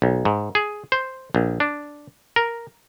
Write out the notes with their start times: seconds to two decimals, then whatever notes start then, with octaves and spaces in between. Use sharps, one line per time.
0.02 B1
0.25 G#2
0.55 G#4
0.92 C5
1.35 A#1
1.60 D4
2.36 A#4